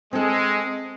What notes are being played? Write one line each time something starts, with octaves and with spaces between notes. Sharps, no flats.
G#3 C4 A4